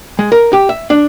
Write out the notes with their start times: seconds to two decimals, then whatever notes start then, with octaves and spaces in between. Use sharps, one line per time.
0.19 G#3
0.32 A#4
0.53 G4
0.69 E5
0.90 D4